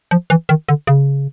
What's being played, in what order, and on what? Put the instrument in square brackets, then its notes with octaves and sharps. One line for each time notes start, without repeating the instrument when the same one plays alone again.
[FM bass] F3
E3
D#3
D3
C#3